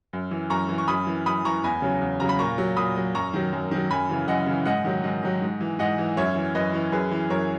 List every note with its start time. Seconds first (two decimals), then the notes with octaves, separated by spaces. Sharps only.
0.13 F#2
0.31 E3
0.50 F#2 A#5 C#6
0.69 E3
0.78 C#6
0.88 F#2 B5 D#6
1.07 E3
1.26 F#2 B5 D#6
1.45 E3 A#5 C#6
1.63 E2 G#5 B5
1.82 C#3 F#3
2.01 E2
2.20 C#3 F#3 A#5
2.29 B5
2.39 A#2 A#5 C#6
2.58 F#3
2.76 A#2 B5 D#6
2.96 F#3
3.14 F#2 A#5 C#6
3.33 D#3 F#3
3.53 F#2
3.71 D#3 F#3
3.90 F#2 G#5 B5
4.09 C#3 E3
4.28 F#2 D#5 F#5
4.46 C#3 E3
4.65 G#2 D#5 F#5
4.85 D#3 F#3
5.04 G#2
5.23 D#3 F#3
5.42 G#2
5.60 E3
5.79 G#2 D#5 F#5
5.98 E3
6.17 F#2 C#5 E5
6.35 E3
6.55 F#2 B4 D#5
6.74 E3
6.92 F#2 G#4 B4
7.11 E3
7.30 F#2 A#4 C#5